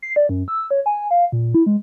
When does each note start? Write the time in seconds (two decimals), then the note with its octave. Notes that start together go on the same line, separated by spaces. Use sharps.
0.02 C7
0.16 D5
0.29 F#2
0.48 E6
0.71 C#5
0.86 G#5
1.11 F5
1.32 A#2
1.54 E4
1.66 G#3